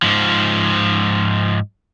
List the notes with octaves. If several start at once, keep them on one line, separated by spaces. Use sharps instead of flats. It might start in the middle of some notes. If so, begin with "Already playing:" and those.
G#2 F3